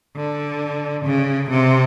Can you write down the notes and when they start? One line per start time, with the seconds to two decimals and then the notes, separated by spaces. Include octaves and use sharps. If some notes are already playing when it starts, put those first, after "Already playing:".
0.16 D3
1.05 C#3
1.50 C3